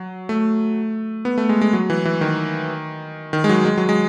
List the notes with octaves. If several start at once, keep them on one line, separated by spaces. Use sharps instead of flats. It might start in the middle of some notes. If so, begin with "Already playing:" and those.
Already playing: F#3
A3
B3
A3
G#3
G#3
F#3
E3
E3
D#3
D#3
G#3
F#3
G#3
F#3
G#3